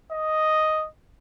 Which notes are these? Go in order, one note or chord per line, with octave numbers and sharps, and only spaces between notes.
D#5